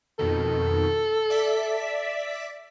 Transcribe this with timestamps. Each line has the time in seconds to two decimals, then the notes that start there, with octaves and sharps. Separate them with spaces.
0.19 F2 B2 D#3 A4
1.30 D5 E5 B6